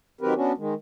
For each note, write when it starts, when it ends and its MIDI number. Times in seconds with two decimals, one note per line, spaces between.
0.21 0.34 51
0.21 0.34 54
0.21 0.34 60
0.21 0.34 67
0.21 0.34 70
0.21 0.34 71
0.36 0.52 59
0.36 0.52 61
0.36 0.52 62
0.36 0.52 66
0.57 0.74 51
0.57 0.74 56